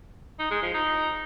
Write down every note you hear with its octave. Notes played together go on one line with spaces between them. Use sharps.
D#4
G#3
F3
D#4